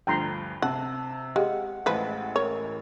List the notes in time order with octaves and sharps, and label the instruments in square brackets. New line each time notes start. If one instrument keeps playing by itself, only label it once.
[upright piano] D2 G2 F3 [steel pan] G5 A#5 C6
[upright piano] C3 [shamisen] F#5 [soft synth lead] A5
[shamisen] G#3 [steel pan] G4 F5 [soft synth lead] F#5
[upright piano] A1 A2 G#3 [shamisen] F3 B4
[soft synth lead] A#4 [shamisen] C#5